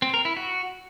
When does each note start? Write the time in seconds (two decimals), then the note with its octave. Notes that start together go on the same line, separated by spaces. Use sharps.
0.02 C4
0.14 A#4
0.25 E4
0.37 F#4